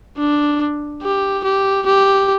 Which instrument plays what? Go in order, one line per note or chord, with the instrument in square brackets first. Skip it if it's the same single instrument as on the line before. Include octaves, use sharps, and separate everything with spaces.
[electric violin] D4
G4
G4
G4